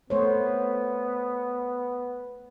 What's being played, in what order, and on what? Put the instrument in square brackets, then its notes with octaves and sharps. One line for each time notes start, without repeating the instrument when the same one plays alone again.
[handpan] A3 C5 C#5 [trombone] B3